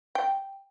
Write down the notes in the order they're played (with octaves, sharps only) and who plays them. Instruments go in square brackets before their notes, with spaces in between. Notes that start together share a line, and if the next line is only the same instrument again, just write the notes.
[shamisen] G5